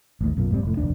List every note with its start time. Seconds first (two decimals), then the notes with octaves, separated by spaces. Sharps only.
0.21 A1 D#2
0.37 B1 F#2 A#2
0.51 F1 G#2 G3 C4
0.63 F1 A2
0.77 F1 A#1 D#2 D4